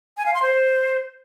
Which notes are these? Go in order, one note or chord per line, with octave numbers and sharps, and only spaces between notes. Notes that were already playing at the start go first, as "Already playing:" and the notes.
G#5
F5
C6
C5